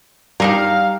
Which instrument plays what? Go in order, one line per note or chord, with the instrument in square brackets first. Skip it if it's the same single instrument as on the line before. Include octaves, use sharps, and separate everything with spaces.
[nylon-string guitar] G3 [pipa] D4 D#4 A#4 [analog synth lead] F5